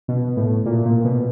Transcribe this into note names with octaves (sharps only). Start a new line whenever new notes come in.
B2
A2
A#2
A#2
B2